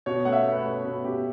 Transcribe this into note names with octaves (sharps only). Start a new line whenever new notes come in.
B2 C#5
A3 F#5
E5
A3
B4
C#5
A3
B2 B4
B2 G4